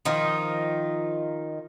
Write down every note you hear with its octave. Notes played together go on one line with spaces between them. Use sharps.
D#3 F3 D#4 F4